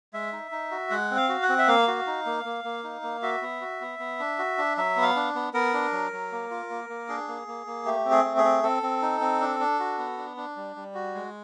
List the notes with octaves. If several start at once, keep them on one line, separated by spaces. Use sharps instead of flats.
G#3 E5
D#4
D#4
F#4
G#3 F#5
C4
F5
F#4
F#5
C4
E5
A#3 F5
F#4
D#4
A#3
A#3
A#3
D#4
A#3
F#4 E5
B3
F#4
B3
B3
D4
F#4
D4
F#3 E5
B3
F5
D4
B3
B3 A#4
D4
F#3
F#3
A#3
F4
A#3
A#3
D4 G#4
A#3
A#3
A#3
A3 G4
C4
G#4
A3
G#4
C4
C4 A4
C4
D#4
C4
D4
D4
F#4
B3
D4
D4
G3
G3
F#4
G#3